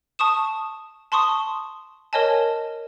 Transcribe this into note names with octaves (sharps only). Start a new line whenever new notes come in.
A5 C#6 D#6 E7
A5 C6 C#6 D#6
A#4 C#5 D#5 G#5 A5